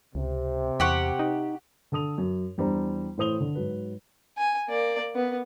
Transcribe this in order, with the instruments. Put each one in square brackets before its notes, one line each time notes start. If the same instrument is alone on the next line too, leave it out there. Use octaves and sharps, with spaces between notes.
[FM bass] C#2 [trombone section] C3
[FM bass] E2 [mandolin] G4 F#5 C#6
[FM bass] D#4
[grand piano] D3 A4 D#6 F7
F#2
E2 G3 D4 C5 A#5
A2 E3 C5 D#6 F7 G7
D3
G#2 F#3 B4
[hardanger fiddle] G#5
A#3 D5
B3